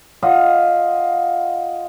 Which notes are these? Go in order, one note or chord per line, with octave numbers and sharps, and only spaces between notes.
F4 D#5 F5 F#5